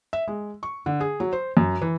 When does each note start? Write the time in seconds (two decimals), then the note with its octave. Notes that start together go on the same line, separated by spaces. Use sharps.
0.13 E5
0.28 G#3
0.63 C#6
0.86 D3
1.01 G#4
1.20 F#3
1.33 C5
1.57 F#2
1.82 E3